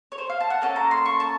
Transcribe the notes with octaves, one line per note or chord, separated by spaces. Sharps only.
C#5
C5
F5
A5
F#5
A#3 C#4 A4 A5
A#5
C6
C#6
A5